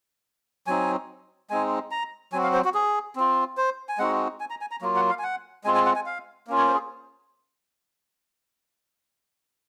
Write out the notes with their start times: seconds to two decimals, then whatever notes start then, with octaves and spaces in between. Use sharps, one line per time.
0.67 F#3 C4 D#4 G#5
1.50 G#3 C4 D#4 G#5
1.91 A#5
2.33 F#3 C4 F#4 G#5
2.43 F5
2.54 C5
2.65 F#4
2.74 G#4
3.16 C4 F4
3.57 C5
3.89 G#5
3.98 G#3 C4 D#4 F#4 F#5
4.40 G#5
4.50 A#5
4.61 G#5
4.71 A#5
4.82 F#3 A#3 F4
4.96 F#5
5.09 F5
5.19 G#5
5.23 F#5
5.64 G#3 C4 F4 G#5
5.75 G#5
5.86 F#5
5.96 G#5
6.06 F5
6.47 A#3 C#4 F4
6.58 C#5
6.68 C5
6.74 G#4